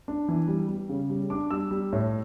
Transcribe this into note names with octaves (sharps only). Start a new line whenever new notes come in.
D4
E3
G3
G3
C#3
G3
D4 D6
G3 E6
G3
A2